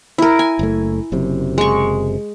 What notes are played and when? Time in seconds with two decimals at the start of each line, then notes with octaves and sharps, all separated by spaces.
0.18 E4 A#4
0.39 G#5
0.59 F#1 A3
1.12 F#1 F#2 C3
1.58 G#3 C#6